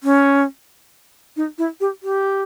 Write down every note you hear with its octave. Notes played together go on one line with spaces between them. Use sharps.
C#4
D#4
E4
G4
G4